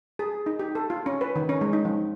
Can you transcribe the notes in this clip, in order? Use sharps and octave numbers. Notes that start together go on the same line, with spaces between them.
G#4
D#4
G4
A4
F4
C#4
B4
D#3
C#4
G#3
D#4
F3